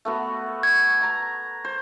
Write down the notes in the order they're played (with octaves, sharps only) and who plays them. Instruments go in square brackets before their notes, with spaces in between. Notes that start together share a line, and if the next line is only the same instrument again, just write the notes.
[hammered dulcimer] A3 B3 F#4
[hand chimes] G#6
[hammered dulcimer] A#5
C5